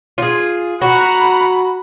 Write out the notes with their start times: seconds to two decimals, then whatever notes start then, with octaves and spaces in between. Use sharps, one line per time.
0.18 F4 G#4
0.81 F#4 F#5 A#5 B5